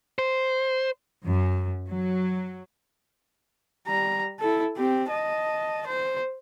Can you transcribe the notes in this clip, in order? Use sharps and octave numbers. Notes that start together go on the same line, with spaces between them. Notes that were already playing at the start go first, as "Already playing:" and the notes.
C5
F#2
F#3
G3 A#5
E4 A4
C4 G4
D#5 A5
C5